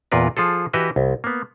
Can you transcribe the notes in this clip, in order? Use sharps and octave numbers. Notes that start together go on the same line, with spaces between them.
E2 A#2 F4 A#4 B4
F3 F4 G#4 A4
E3 F#4 G4 B4 D#5 E5
C2
A#3 B3